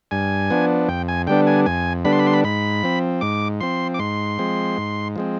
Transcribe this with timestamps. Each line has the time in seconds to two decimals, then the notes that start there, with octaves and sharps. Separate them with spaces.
0.11 G2 G#5
0.50 F3 B3 D4
0.89 F2 G5
1.08 G#5
1.27 D3 G3 B3 D4 G5
1.47 G#5
1.66 F2 G#5
2.05 D3 G3 B3 D4 B5
2.12 C6
2.19 B5
2.27 C6
2.34 B5
2.44 G#2 B5
2.84 F3 C4
3.21 G#2 D6
3.60 F3 C4 C6
3.94 D6
3.99 G#2 C6
4.39 F3 G#3 C4
4.78 G#2
5.16 F3 G#3 C4